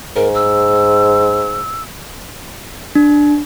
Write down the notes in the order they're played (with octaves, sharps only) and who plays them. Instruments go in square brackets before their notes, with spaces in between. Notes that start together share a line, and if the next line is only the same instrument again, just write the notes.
[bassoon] G#2 [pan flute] A#4
[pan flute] E6
[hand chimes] D4